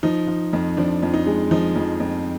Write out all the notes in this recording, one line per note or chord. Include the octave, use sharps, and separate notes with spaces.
F3 D#4
F3
F2
F3 D4
F2
D#4
G#3
F3 D#4
F2
F2